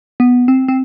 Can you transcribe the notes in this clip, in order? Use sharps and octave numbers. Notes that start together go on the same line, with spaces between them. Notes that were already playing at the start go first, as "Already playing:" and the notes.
B3
C4
C4